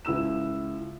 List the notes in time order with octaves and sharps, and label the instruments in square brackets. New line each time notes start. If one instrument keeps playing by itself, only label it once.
[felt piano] C#2 E4 E6 E7